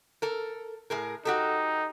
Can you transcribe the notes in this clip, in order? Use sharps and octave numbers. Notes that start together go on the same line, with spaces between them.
A4 A#4
A2 G#4 A#4
D#4 F#4 G4 A4